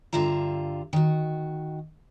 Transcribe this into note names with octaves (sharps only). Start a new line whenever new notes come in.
G2 D3 F4 E5 A#5
D#3 F#4